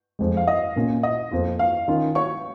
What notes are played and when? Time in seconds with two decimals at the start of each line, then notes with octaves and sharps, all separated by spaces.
0.19 F2 F3 G#3
0.37 F5
0.47 D#5
0.76 A#2 A#3 C#4 F4
1.03 D#5
1.31 F2 F3 A#3 F4
1.59 F5
1.88 D#3 C#4 F4
2.15 C#5 C#6